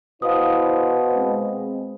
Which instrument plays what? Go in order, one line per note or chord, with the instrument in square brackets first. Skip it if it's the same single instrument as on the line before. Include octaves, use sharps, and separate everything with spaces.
[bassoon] B2 [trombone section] E4 C5 [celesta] F5 D#6
[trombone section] G#3 C4